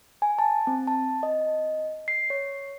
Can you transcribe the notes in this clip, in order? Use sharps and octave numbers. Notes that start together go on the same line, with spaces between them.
G#5
A5
C4
A5
D#5
C7
C#5